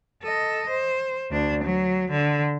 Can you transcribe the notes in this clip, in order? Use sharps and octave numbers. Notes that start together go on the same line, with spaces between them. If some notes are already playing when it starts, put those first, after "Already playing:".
A4 D#5
C5
D2 D4
F#3
D3